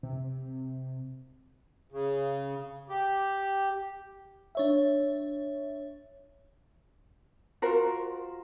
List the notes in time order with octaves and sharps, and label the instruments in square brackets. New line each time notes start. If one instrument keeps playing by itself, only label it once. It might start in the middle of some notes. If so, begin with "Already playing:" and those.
[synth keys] C3
[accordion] C#3
G4
[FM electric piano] D4 C#5 E5
[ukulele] F4 F#4 A#4 C5